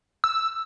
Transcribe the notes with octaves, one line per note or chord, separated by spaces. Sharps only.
E6